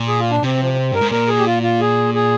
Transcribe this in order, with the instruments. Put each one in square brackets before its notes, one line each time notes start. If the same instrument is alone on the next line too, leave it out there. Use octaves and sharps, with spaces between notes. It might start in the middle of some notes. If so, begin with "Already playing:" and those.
Already playing: [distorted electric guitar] A#2
[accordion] G#4
F4
D4
[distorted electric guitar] C3 [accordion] C4
[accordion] F3
C4
[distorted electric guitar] G2 [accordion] A#4
[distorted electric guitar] G#2
[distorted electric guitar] A#2 [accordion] A#4
[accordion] G#4
G4
F4
F4
G#4
G#4